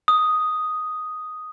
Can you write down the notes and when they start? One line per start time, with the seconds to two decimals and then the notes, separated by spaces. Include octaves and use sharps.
0.08 D#6